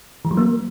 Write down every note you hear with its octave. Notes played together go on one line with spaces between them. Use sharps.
E3
F#3
A#3